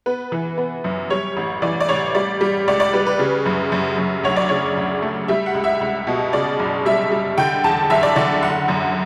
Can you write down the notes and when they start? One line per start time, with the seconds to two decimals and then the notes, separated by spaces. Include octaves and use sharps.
0.06 B3 B4
0.32 E3
0.58 B3
0.84 F#2
1.10 G3 C#5
1.37 A1
1.62 E3 D5
1.80 D5
1.89 A1 C#5
2.15 G3 D5
2.41 G3
2.68 C#2 D5
2.80 D5
2.93 G3 B4
3.06 B4
3.19 C#3
3.46 F#2
3.72 F#2
3.98 F#2
4.23 D2 C#5
4.36 D5
4.49 C#3 C#5
4.77 D2
5.02 A3
5.28 G3 E5
5.46 F#5
5.55 C#2
5.64 E5
5.81 C#2
6.07 B2
6.33 C#3 D5
6.59 F#1
6.85 G3 E5
7.11 G3
7.38 D3 G5
7.64 E2 A5
7.90 F#1 E5
8.03 D5
8.16 D3 D5
8.42 F#1 F#5
8.68 F#2